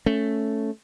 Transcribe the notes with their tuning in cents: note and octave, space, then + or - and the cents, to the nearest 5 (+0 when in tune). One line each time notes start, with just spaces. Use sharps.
A3 +0 C#4 +0